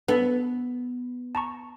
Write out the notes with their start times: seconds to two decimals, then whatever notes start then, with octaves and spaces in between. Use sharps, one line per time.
0.08 B3 D4 A4 B4
1.35 A5 A#5 C#6